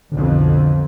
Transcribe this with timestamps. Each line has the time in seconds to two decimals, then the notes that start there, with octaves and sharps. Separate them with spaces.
0.12 B1 F2 D3